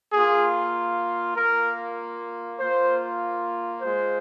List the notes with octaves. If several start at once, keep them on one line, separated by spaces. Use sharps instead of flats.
A#3 F4 G#4
A#3 F4 A#4
A#3 F4 C5
G#3 F4 C5